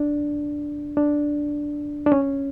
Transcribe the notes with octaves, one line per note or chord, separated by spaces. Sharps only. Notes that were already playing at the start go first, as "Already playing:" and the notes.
Already playing: D4
D4
D4
C#4